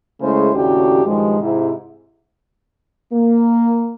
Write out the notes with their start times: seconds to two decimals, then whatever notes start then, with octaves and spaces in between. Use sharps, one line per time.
0.21 C#3 G#3 A3 E4 G#4 C5
0.54 D#2 A2 C#3 D4 F#4 G4
1.06 G2 D#3 F3 G#3
1.41 G#2 C3 E4
3.13 A#3